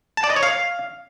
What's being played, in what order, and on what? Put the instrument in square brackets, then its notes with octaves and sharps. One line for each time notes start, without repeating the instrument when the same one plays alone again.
[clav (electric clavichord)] A5
D5
D#5
C#5
F5